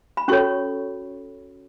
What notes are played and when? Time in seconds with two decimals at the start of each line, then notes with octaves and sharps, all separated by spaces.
0.17 B5
0.28 C#4 F#4 A4 C#5 C#6